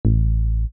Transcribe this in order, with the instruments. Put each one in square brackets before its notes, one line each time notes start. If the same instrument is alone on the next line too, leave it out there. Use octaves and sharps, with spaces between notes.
[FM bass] A1